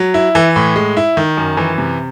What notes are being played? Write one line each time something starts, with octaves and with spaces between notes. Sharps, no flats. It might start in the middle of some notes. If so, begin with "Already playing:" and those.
Already playing: F#3
E4
E3
A2
G#3
E4
D#3
F#2
E3
C3